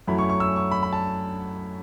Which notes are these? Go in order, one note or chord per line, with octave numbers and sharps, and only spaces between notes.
F#2 F#3 A3 E4 B5
C#6
C#6
E6
C#6
B5
B5
A5